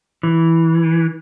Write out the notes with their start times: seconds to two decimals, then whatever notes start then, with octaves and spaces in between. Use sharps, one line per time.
0.23 E3